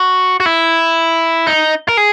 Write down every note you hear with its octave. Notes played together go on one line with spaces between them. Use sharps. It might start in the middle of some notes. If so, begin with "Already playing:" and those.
Already playing: F#4
F#4
E4
D#4
A#4
G#4